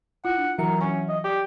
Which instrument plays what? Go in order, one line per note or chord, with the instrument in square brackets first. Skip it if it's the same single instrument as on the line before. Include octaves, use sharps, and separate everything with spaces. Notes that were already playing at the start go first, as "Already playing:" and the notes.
[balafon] E4 F4 [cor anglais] F#5
[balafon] D4
[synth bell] E3 F#3 C#7 [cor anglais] A#4
[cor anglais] C#4 [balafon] C#6
[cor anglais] D#5
[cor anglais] G4 [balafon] D5